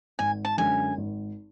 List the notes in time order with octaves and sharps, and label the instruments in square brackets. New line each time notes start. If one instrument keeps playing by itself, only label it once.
[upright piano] G#1 [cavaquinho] G#5
[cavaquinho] A5
[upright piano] F#2 D3 G#3 [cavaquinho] G#5
[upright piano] G#1